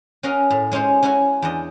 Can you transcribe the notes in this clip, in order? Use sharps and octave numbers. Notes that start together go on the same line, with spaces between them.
C#4 F#4 A#4 D#5 F5
A2
G#3 C#4 D#4 C5 C#5
C#4 E4 F#4 F#5 G#5
E2 D4 D#5